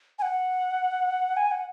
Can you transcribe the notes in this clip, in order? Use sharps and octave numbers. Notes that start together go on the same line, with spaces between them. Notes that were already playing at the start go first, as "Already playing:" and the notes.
G#5
F#5
G#5
F#5